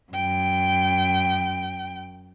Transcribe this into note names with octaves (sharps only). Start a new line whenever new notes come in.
F#2 G5